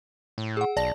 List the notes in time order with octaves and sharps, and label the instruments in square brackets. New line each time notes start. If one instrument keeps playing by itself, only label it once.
[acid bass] A2
[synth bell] G#4 F#5
[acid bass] B1 [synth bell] D5 A5 A#6